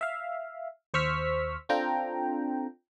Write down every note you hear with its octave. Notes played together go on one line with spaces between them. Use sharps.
E5 F5
D#2 C5 C#6 E6 F6 B6
C4 D4 F4 A4 G5 A#5